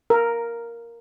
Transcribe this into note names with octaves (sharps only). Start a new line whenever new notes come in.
A#4